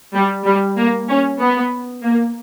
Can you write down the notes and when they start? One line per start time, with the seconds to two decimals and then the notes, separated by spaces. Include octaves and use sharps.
0.14 G3
0.45 G3
0.77 A#3
1.09 C#4
1.40 B3
2.04 A#3